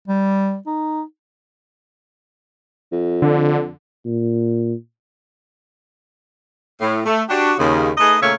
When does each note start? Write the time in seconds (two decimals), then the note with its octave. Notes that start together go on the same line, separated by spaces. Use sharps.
0.08 G3
0.66 D#4
2.92 F2
3.22 D3
4.06 A#2
6.81 A2
7.05 A3
7.29 D4 F#4 G4
7.58 D#2 C#3
7.98 A3 D#4 G#4 B4 D#5
8.21 A#2 C#3 A3 A#3 C#5 E5